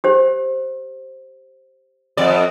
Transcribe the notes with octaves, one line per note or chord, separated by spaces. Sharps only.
G4 C5
F2 D5